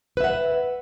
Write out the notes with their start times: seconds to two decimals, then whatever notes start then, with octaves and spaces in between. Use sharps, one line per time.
0.17 B4
0.21 E5
0.24 F#5